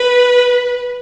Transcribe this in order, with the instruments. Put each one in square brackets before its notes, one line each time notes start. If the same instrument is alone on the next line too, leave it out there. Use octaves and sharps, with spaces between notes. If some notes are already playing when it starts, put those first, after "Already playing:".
Already playing: [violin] B4